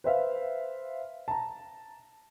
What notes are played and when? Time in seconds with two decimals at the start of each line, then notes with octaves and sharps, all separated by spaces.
0.04 B4 C5 E5 F5
1.28 A5 A#5